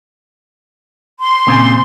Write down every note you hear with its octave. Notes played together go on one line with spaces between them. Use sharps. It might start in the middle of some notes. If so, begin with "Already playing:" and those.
C6
A#2 C#3 C4